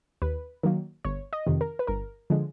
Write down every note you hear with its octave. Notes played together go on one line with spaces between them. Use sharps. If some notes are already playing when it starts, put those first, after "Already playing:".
D#2 B4
D#3 F#3 A#3
G1 C#5
D#5
F2 C3 D#3
A#4
B4
G1 A#4
D3 F3 G#3